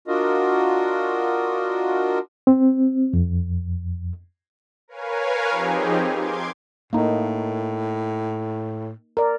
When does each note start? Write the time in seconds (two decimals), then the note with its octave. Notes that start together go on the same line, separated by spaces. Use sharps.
0.08 D4 F4 F#4 A#4 D#5
2.47 C4
3.13 F2
4.88 A#4 B4 C#5 F5 G#5
5.50 F3 C4 D#4 G4 G#4
6.13 C6 D6 G#6
6.93 A2 A#3 D#4
9.17 A#4 D5